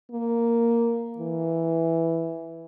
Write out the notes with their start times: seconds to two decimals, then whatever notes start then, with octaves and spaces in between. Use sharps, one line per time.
0.11 A#3
1.18 E3